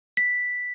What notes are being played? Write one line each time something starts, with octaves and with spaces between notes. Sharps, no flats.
B6